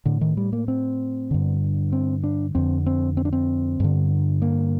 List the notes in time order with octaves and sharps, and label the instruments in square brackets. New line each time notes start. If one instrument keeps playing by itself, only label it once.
[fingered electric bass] A2 D3
D#3
G3
A#3
C4
G2 D3
C4
D4
F2 D3 C4
C4
C4
D4
C4
G2 D3
A#3